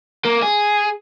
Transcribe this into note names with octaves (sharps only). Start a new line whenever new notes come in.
A#3
G#4